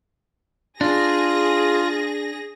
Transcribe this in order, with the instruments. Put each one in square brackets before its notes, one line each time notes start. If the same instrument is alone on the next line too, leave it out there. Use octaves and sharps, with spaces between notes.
[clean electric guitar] D4 [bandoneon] F4 [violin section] G#4 A#6